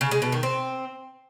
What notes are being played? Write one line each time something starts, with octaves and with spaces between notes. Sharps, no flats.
C#3
G#3
B2
D#3
C4